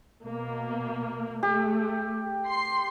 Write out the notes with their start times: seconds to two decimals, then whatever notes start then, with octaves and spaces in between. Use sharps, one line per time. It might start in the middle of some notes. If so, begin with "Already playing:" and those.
0.24 B2 A#3
1.43 A3 G4
2.47 C6 C7